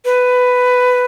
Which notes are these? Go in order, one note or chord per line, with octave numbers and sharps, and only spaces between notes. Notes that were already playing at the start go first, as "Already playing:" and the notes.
B4